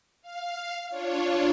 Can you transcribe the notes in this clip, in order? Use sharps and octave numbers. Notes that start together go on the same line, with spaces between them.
F5
D4 F4 C#5